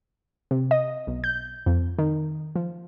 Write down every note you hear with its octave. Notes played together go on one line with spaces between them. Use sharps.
C3
D#5
B1
G6
F2
D#3
F3